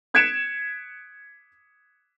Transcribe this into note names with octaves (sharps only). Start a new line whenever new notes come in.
F#6 G#6 B6 C#7 D7 E7